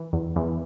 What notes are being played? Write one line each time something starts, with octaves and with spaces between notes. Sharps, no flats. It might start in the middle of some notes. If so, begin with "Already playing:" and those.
Already playing: E3
E2
E2